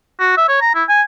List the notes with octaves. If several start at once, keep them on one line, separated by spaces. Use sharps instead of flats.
F#4
E5
C#5
A#5
E4
G#5